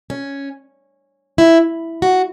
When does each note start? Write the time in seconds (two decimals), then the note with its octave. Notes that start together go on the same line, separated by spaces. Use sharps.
0.10 C#4
1.38 E4
2.02 F#4